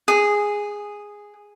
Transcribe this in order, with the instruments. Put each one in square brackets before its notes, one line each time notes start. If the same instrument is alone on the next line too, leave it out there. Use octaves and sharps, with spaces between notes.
[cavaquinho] G#4